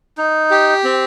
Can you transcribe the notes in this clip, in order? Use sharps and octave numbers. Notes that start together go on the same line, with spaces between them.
D#4
G4
C4